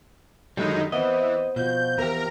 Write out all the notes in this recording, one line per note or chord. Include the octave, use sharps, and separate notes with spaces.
F#2 D3 D#3 G3 G#3 D#4 B5
E3 B3 C4 C5 D#5
B2 F3 F#4 G6
E2 G4 A#4 A#5